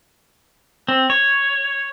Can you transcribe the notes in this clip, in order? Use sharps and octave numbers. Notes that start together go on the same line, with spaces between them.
C4
C#5